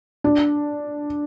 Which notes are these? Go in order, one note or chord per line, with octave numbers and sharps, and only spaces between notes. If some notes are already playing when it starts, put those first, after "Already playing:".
D4